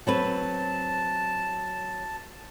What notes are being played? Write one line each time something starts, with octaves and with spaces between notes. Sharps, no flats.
F#3 C4 B4 A5